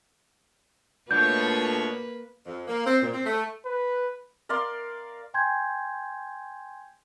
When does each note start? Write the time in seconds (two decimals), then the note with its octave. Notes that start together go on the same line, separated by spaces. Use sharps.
1.11 B2 A3 A#3 D4 F4 B4 C#5 G6
2.45 F2
2.67 A#3
2.85 C4
3.01 A#2
3.12 C4
3.25 A3
3.65 B4
4.49 A#4 D5 F5 C6
5.34 G5 G#5 C6 G6 G#6